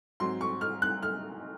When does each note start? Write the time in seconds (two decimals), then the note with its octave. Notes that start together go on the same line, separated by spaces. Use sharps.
0.20 G#2 F#3 C4 C6
0.41 C#6
0.61 F6
0.82 F#6
1.03 F6